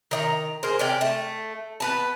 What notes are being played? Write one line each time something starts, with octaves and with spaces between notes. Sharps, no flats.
D#3 D#5 A#5
G#4 A#4 C5
C3 C#4 D5 G5
A3 A5
B3 B4 A5